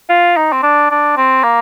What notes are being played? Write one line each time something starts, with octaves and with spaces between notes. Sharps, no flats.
F4
D#4
C4
D4
D4
C4
A#3